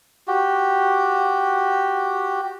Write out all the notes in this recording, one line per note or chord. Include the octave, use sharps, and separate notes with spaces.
F#4 G4